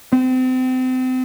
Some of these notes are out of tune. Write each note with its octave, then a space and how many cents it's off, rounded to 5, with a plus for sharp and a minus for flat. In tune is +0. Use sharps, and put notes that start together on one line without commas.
C4 -35